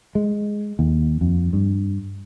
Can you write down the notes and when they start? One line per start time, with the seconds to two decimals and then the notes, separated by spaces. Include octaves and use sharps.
0.15 G#3
0.79 D#2
1.21 F2
1.53 G2